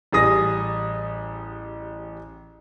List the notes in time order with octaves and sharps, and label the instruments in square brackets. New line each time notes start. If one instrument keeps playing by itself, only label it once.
[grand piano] A1 G3 G#4 D#6 A#6